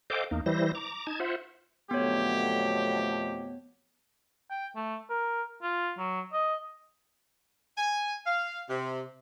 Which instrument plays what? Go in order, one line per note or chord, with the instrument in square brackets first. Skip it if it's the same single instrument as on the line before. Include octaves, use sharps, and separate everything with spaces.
[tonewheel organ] A4 C5 D#5 F5 G5 D6
E2 A#3 D#4
E3 G3 E4 C5 A#6
A#5 D6
D#4 A5 G#6
F4 C5 E5 F#5
[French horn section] F2 B2 A3 [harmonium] D3 F#3 [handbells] B3 C#5 [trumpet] G4
[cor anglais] G5
A3
A#4
F4
F#3
D#5
[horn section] G#5
F5
C3